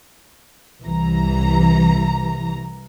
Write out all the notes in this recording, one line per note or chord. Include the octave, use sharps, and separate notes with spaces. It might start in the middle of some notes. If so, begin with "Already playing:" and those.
C2 E3 A#5